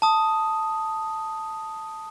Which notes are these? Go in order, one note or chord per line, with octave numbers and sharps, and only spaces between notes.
A5 D#6